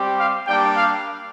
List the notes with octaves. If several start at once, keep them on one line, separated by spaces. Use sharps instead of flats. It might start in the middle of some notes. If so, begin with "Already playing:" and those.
Already playing: G3 C4 G4
F5
G3 A#3 D4 G4 G5
F5